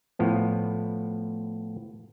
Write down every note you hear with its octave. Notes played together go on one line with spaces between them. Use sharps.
A2 F3 B3